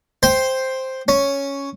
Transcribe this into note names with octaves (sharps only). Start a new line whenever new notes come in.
C5 G5 C6
C#4